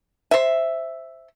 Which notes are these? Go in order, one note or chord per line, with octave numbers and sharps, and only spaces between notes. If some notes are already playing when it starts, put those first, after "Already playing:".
C5 E5